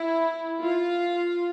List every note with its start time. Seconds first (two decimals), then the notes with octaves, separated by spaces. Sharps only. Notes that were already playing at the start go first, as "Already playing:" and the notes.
Already playing: E4
0.61 F4